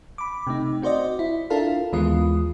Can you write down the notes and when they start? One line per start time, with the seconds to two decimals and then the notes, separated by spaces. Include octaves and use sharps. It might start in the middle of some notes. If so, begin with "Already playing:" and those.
0.18 B5 D6
0.47 C3 A3 D#4
0.82 C4 F#4 C5 D5 D#5
1.19 E4
1.50 D4 E4 F4 A4 A#4 F5
1.93 D#2 E3 G#3 B3 F4 D#6